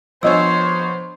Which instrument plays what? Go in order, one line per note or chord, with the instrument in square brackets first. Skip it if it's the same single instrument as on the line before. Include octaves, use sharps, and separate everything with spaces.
[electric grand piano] F3 B3 C#5 [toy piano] D4 D#5 E6 [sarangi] C5